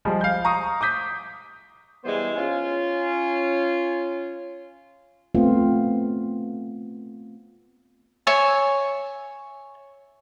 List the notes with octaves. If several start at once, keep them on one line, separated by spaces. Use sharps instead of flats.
F3 G3 G#3
F5 G6
A#5 C#6 D#6
D6 D#6 G6 B6
E3 G3 G#3 B3 C5
C#4 F4
A3 B3 C4 F4
C#5 E5 G#5